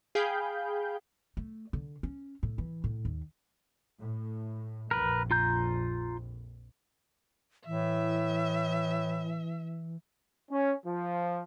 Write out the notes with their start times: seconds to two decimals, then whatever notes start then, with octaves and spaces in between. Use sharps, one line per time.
0.15 G#4 F5 G5 B5 G6
1.37 A3
1.73 D3
2.03 C#4
2.43 A2
2.58 E3
2.84 A2
3.05 D#2
3.99 A2
4.91 A#1 F2 A#4 B4
5.31 F4 A#5 G6
7.67 A2 E3 E5
10.50 C#4
10.85 F3